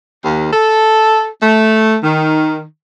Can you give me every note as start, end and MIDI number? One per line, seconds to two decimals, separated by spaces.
0.24 0.47 39
0.53 1.27 69
1.41 1.96 57
2.02 2.61 51